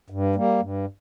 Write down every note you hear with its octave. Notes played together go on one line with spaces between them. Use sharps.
G2
G3 A#3
G2